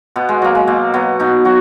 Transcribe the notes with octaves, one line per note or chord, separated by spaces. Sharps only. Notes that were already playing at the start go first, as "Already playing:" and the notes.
B2 B3
G#3
F#3 A#3
G#3
B2 A#3
F#3 B3
B2 D#4
F#3 F#4